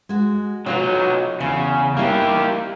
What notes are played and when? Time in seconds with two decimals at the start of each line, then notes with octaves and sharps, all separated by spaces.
0.09 G#3 F#4
0.66 F#3 D#4 F4 F#4 C#5
1.40 E2 C#3
1.97 G3 A#3 E4 G4